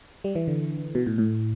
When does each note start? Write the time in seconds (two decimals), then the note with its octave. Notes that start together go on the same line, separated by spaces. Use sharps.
0.24 G3
0.35 E3
0.48 D3
0.95 B2
1.07 A2
1.18 A2